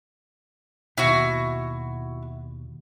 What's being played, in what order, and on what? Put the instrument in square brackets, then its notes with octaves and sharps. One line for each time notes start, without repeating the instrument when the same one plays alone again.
[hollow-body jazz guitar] D#2 B2 [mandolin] E4 F#4